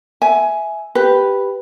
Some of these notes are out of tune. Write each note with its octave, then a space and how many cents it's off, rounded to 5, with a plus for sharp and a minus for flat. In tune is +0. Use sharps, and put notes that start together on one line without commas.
E5 -5 G#5 +10
G4 +0 B4 +0